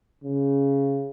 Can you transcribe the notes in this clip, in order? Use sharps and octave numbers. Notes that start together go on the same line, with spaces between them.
C#3